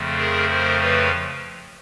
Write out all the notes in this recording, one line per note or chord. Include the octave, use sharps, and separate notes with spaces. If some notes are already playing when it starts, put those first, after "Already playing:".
Already playing: F2 C#3 F3 A3
G#4 A#4
A#4 C5
B4 C#5